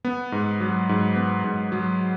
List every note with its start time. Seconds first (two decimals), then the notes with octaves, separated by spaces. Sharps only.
0.05 B3
0.32 G#2
0.61 F#3
0.89 G#2
1.16 B3
1.44 G#2
1.72 F#3